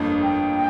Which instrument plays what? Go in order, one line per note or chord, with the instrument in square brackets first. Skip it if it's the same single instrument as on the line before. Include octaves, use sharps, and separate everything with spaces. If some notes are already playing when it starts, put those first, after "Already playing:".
Already playing: [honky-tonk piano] G1 F2 A#3
[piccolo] G5